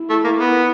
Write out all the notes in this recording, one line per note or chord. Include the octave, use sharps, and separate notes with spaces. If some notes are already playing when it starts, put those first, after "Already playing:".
Already playing: E4
A3
A#3
B3